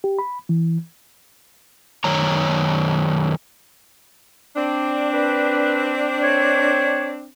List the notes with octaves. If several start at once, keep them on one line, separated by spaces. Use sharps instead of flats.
G4
B5
E3
F#2 D#3 C#5 A#5
C4 D4
B4
C#5